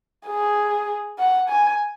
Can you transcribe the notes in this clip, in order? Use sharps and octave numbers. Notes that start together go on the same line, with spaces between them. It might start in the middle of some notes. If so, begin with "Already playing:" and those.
G#4
F#5
G#5